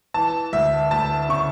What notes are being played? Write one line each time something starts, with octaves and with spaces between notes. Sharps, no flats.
E3 A5
D2 E5
D2 A5
C#3 C#6